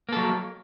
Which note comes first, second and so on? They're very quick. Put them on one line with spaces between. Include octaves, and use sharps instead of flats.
A#3 A4 F#3